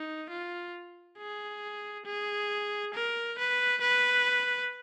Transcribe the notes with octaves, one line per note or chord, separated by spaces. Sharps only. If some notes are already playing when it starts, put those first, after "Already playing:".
Already playing: D#4
F4
G#4
G#4
A#4
B4
B4